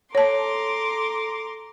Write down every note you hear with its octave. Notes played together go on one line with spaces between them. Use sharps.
A4 C#5 A5 A#5 C6 D6